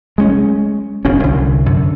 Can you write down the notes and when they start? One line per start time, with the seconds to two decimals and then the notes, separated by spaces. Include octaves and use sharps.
0.18 G#3 A#3 C#4
1.05 F#1 B2 C#4
1.23 C2 D3
1.66 F#2 D3